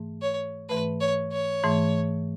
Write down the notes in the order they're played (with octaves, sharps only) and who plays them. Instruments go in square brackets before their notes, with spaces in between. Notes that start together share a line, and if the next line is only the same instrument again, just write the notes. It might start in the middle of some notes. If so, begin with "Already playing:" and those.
Already playing: [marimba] G#2 E3 A3
[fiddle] C#5
[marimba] G#2 E3 A3 [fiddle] B4
[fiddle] C#5
C#5
[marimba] G#2 E3 A3